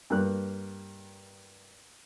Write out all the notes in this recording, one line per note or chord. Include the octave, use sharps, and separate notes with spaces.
G2 A#3 F#6